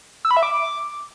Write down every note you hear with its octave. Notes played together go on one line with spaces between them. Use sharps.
E6
B5
E5
D6